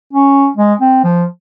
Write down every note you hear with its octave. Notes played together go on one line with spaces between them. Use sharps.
C#4
G#3
C4
F3